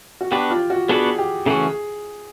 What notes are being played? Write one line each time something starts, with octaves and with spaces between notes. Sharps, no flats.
F#4
B3 D4 F#4 G4 B4
F4
F#4
B3 D4 F#4 G#4 B4
G4
C#3 E3 A3 C#4 F#4 G#4